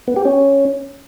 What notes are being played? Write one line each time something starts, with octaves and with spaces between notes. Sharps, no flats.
B3
G4
C#4